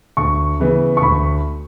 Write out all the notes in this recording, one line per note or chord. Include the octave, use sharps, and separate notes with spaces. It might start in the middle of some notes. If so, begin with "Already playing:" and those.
D2 C#6
C#3 E3 B3
C#6
D2 B5